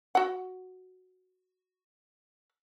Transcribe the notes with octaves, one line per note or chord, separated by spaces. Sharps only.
F#4 F#5